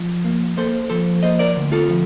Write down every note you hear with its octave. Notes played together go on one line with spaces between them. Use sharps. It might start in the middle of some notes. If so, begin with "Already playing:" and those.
Already playing: F3
A#3
A#3 A4 C5
F3 A4 C5
A#3 C5 D#5
A#4 D5
D2
F4 A4
F3